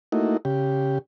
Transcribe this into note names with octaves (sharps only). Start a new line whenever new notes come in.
A3 A#3 D#4 E4 F#4
C#3 G4